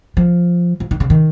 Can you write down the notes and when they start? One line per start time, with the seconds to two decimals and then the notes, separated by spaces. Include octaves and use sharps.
0.17 F3
0.80 F3
0.91 D#3
1.00 C#3
1.10 D#3